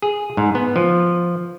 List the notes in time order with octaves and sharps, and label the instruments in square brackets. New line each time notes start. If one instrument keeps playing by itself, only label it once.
[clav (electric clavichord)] G#4
G#2
B3
F3